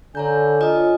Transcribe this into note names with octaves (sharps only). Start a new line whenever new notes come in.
D3 C#5 G#5 A#5 G6
F4 C#5 D#5 D#6